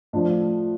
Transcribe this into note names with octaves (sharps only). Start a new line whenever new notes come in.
A2 F3 D4